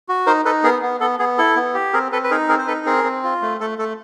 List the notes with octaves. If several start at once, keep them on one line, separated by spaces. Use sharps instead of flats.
F#4
D#4 A#4 C5
D#4 A4 B4
B3 G#4 A#4
B3
B3 A4
B3 G#4
E4 A4
B3
G4
C4 G#4 A#4
C4 A4 B4
B4
D#4 G#4 A#4
C4 G#4 A#4
C5
D#4 A4 B4
C4 G#4 A#4
C4
F4
A3
A3 A4
A3 A4